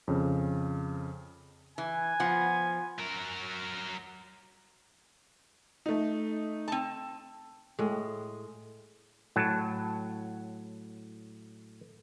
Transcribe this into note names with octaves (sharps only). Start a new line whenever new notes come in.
F2 C#3
E3 G#5
F3 B3 F#5
F#3 A#4
A3 D#4
C4 A5
A2 G#3
A2 F#3 A5